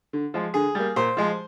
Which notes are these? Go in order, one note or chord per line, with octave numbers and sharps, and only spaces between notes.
D3
F3 G#3
D3 G#4
G3 A#3
A#2 C5
F3 G#3